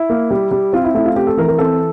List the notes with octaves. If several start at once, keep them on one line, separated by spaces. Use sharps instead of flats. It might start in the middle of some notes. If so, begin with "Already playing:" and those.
Already playing: E4
A#3
G3
G3
C4 F4
E4
A3 E4
F4
C4 G4
A4
E3 A#4
A#4
C4 A4